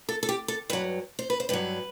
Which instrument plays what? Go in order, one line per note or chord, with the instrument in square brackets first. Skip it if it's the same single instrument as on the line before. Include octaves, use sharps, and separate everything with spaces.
[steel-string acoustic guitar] A4
A4
G4
A4
G2 F#3 B4
C5
B4
C5
G2 F#3 B4